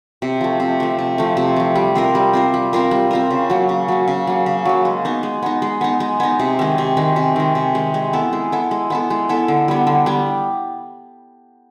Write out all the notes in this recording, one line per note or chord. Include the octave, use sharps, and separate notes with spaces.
C3
F3 A3
C3
F3 A3
C3
F3 A3
C3
F3 A3
G3
C4 F4 A#4
G3
C4 F4 A#4
G3
C4 F4 A#4
G3
C4 F4 A#4
C#3
F#3 A#3
C#3
F#3 A#3
C#3
F#3 A#3
C#3
F#3 A#3
G#3
B3 D#4
G#3
B3 D#4
G#3
B3 D#4
G#3
B3 D#4
C3
D#3 G#3
C3
D#3 G#3
C3
D#3 G#3
C3
D#3 G#3
G#3
B3 E4 A4
G#3
B3 E4 A4
G#3
B3 E4 A4
G#3
B3 E4 A4
D3
G3 B3
D3
G3 B3